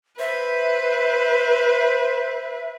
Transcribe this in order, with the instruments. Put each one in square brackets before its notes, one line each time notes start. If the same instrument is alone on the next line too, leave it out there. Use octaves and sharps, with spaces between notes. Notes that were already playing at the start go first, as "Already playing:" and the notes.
[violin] B4 [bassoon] C5 [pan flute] E5